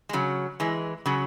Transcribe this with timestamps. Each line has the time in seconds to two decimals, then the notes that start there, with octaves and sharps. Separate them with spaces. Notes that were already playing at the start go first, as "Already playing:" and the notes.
0.09 G#3
0.13 C#3 F#3
0.60 E3 G#3
1.06 C#3 F#3